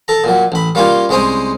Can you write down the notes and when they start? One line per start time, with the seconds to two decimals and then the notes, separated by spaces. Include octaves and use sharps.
0.08 A4 A#5
0.24 A#2 F#3
0.52 A1 B5
0.75 G3 A#3 C#4 F4 G4
1.09 C2 G#3 C#4 C5 D#6